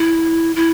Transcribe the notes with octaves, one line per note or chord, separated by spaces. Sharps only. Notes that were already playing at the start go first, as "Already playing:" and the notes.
Already playing: E4
E4